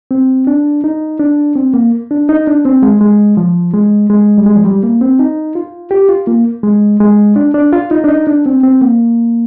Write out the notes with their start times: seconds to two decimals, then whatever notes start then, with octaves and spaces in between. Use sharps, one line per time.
0.11 C4
0.47 D4
0.84 D#4
1.19 D4
1.56 C4
1.74 A#3
2.11 D4
2.29 D#4
2.47 D4
2.65 C4
2.83 G#3
3.01 G#3
3.37 F3
3.73 G#3
4.10 G#3
4.38 G3
4.46 G#3
4.56 F3
4.65 G3
4.83 A#3
5.01 C4
5.19 D#4
5.55 F4
5.91 G4
6.09 F4
6.27 A#3
6.63 G#3
7.00 G#3
7.36 D4
7.54 D4
7.73 F4
7.91 D#4
8.04 D4
8.09 D#4
8.27 D4
8.46 C4
8.63 C4
8.81 A#3